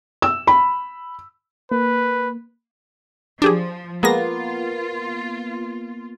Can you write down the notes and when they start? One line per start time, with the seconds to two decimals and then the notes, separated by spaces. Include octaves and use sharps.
0.22 E6
0.47 B5
1.72 A#3 B4
3.42 F3 D4 G4 G#4
4.03 G#3 A#3 B3 F4 G#4 A#6